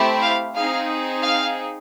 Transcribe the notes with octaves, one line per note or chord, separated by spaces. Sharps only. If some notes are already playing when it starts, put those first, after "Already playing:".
Already playing: A3 C4 E4 G4
F5
C4 D#4 G#4 F5
F5